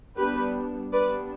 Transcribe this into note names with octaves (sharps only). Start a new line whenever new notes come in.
G3 B3 D4 G4 B4
G3 B3 D4 B4 D5